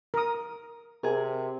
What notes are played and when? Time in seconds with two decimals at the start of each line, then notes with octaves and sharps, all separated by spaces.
0.14 A#4 D#6
1.03 C3 G#4 A#4